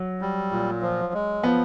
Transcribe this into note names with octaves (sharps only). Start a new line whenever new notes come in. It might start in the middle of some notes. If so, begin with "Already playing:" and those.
Already playing: F#3
G3
A#2
F3
G#3
F3 B3